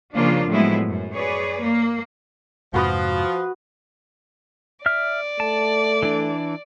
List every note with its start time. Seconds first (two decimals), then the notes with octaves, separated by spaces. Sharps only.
0.15 C#3 F3 A#3 D4 F4
0.50 A2 F3 F#3 G#3 B3 E4
0.87 F#2
1.16 G#4 B4 C#5 D5
1.63 A#3
2.74 F2 G#2 C3 F3 F#4 B4 D#6
4.86 D5 E5 F6
5.40 A3 A5
6.03 E3 D4